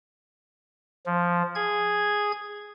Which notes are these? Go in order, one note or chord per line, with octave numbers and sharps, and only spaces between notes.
F3
G#4 G#6